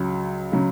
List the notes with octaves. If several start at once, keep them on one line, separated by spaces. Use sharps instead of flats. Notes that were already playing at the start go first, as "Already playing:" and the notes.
Already playing: C#2 C#3 F#3
C#3 F#3